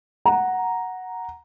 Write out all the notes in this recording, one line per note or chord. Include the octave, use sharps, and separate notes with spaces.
F#5 A#5